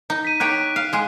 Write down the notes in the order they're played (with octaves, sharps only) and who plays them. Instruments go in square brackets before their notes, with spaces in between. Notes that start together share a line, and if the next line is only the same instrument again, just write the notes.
[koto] D#4
[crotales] B6 D#7
[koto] D#4 G4 C#5 [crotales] F#6 D7
[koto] F5
G#3 G#4